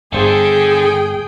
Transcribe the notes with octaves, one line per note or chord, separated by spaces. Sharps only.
G1 D3 G#4 A4 C5 G5